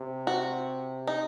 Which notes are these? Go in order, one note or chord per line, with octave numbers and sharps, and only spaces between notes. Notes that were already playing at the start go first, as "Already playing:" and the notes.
Already playing: C3
F#4
D#4